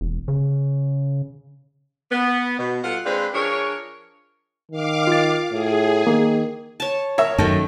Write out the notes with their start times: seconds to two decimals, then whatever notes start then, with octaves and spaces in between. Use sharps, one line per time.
0.01 E1
0.28 C#3
2.11 B3
2.59 B2
2.84 G3 F4 A4 F#5
3.06 G#3 C4 D4 B4 C5 F5
3.34 F3 D4 G#4 A#4 C#5
4.72 D#3 F5 D6
5.07 F4 A6
5.52 A2 G#4
6.07 D#3 A#3
6.80 C#5 A5
7.18 A#4 C#5 E5
7.38 F#2 D#3 A3